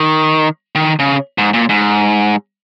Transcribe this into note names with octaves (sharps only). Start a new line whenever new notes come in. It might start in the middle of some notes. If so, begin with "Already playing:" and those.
Already playing: D#3
D#3
C#3
G#2
A#2
G#2